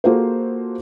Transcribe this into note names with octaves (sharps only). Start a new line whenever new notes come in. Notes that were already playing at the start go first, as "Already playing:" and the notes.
A#3 F4 F#4 G#4 A4 C5